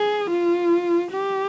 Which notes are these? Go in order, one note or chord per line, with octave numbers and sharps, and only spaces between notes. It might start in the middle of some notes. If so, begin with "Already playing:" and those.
Already playing: G#4
F4
G4